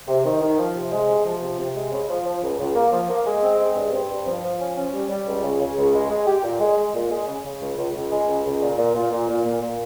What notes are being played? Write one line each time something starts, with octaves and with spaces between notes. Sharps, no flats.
C3
D#3
D#3
F3
C3
G#3
C3
F3
C3
C3
G#3
C#3
F3
F3
C#2
C#2
A#3
F3
A#3
G#3
C4
G#3
G2
C4
G2
F3
F3
C#4
C#4
G3
G3
C#2
C#3
C#3
C#2
G#3
G#3
G4
A#2
G#3
G#3
A#2
G#3
C#3
C#3
C#2
C#2
C#2
G#3
C#2
C#2
A#2
A#2
A#2
A#2
A#2
A#2
A#2